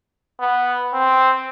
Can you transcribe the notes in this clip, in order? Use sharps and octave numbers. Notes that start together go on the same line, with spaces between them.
B3
C4